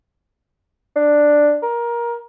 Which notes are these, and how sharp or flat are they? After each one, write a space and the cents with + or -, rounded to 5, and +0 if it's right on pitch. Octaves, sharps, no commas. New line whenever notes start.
D4 +5
A#4 +20